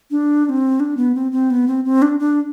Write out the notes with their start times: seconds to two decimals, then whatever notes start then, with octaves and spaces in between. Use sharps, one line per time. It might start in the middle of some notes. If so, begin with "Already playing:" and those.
0.10 D4
0.45 D4
0.49 C4
0.80 D4
0.97 B3
1.15 C4
1.32 C4
1.50 B3
1.67 C4
1.84 C4
2.02 D4
2.19 D4